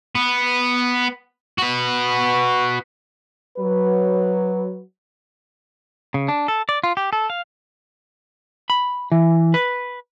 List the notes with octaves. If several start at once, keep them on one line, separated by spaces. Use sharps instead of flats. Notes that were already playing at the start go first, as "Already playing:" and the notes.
B3
F#4 B4
F#3 B4
C#3
D4
A4
D5
F4
G4
A4
F5
B5
E3
B4